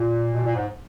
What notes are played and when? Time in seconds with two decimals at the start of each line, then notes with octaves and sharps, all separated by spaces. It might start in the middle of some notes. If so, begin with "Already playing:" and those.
Already playing: A#2
0.33 B2
0.45 A#2
0.55 G#2